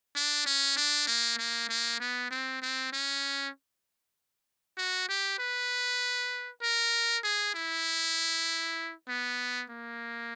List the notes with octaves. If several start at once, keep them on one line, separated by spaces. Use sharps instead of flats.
D4
C#4
D4
A#3
A#3
A#3
B3
C4
C4
C#4
F#4
G4
B4
A#4
G#4
E4
B3
A#3